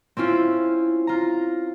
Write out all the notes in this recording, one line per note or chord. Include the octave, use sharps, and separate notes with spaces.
C4 C#4 E4 F4
F4 A#5